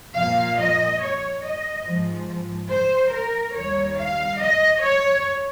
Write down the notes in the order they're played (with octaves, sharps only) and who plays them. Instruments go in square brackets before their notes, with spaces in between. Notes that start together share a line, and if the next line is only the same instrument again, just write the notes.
[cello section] A#2 F3 F5
D#5
C#5
D#5
G#2 F3
C5
A#4
D#2 D#3 G3 C#5
F5
D#5
C#5